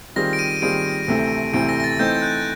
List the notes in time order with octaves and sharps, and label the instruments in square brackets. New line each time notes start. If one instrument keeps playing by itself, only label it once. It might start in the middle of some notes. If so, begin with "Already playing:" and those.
[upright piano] D#3 G3 C4 F4 G#4 [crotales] A#6
[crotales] D7
D#7
[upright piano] D#3 G3 C4 F4 G#4 [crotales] D7
[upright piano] D2 C3 E3 A3 C4
[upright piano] D2 C3 E3 A3 C4 [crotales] D7
[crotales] A#6
A#6
A6
[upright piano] E3 A3 C4 D#4 [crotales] G6
[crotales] F#6